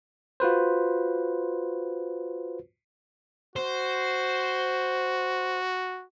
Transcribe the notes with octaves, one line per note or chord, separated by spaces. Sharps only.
F4 F#4 B4 C5
F#4 C5